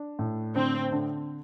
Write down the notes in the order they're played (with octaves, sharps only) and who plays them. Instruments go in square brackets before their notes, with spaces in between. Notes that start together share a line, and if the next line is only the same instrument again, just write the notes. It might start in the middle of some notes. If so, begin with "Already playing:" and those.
Already playing: [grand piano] D4
A2
[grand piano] D3 [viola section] C4
[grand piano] D3